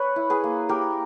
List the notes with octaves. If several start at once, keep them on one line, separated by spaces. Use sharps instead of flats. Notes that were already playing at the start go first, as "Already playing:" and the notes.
Already playing: B4 C#5
E4
G#4 B4
A#3
A#3 G4 A#4